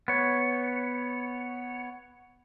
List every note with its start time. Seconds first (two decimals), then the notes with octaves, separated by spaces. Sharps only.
0.08 B3 C#5